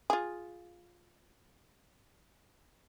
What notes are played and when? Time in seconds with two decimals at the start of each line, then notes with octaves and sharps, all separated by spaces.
0.10 F4 G#4